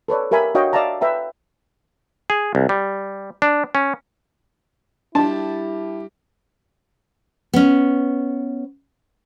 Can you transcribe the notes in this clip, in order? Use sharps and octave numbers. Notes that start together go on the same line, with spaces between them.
A4 B4 C#5 D5
G4 A#4 E5 G#5 B5
D4 F#4 C#5 D#5 F5 G5
D5 E5 F5 A5 A#5
B4 E5 G5 A#5
G#4
C2
G3
D4
C#4
G3 D4 E4 G4 A5
B3 C#4